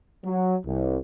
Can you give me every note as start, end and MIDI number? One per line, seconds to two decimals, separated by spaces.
0.24 0.56 54
0.66 0.98 36